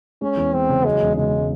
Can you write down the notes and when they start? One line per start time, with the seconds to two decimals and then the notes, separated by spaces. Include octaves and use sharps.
0.22 G#3 C#4
0.37 E2
0.53 E3 C4
0.69 C#3
0.85 F#3 G#3
1.01 E1
1.17 C#3 G#3